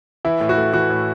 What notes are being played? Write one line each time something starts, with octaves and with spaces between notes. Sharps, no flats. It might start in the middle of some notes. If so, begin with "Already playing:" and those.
E3 E4
A2
F#4
A3
E3 F#4
A2